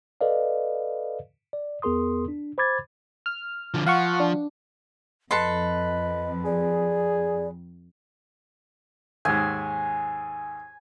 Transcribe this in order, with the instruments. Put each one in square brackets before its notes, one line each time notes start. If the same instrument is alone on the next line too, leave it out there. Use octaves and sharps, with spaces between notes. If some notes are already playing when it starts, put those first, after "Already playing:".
[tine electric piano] A4 B4 D5 D#5 F5
D5
E2 B3 G#4 A#4 C6 D#6
D4
C5 B5 D6 G#6 A6
[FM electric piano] F6
[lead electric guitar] D3 F3
[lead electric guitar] F3 [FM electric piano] F5 F#5 C#6
[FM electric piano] D4
[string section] F2 [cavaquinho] A4 B4 C6 [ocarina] D#5
[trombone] G#4 [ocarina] D5
[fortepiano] D#2 G#2 [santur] G#5